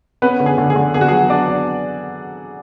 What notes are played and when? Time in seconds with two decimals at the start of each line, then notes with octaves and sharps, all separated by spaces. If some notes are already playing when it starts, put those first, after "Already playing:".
0.22 B3 C#4 B4
0.40 D3
0.46 G#4
0.58 D3
0.70 G#4
0.76 D3
0.94 B3 G#4
1.01 F#4
1.08 G#4
1.12 F#3
1.30 B3 D4 D5
1.48 D4